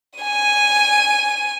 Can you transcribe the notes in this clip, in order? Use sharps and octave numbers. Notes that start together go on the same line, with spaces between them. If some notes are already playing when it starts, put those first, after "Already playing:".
G#5 D#7